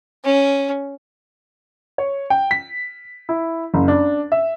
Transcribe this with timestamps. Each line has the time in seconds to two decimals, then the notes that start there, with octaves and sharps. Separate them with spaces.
0.24 C#4
1.98 C#5
2.30 G5
2.51 B6
3.29 E4
3.74 F#1
3.88 D4
4.32 E5